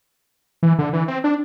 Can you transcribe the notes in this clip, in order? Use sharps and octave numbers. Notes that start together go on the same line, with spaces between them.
E3
D3
E3
C4
D4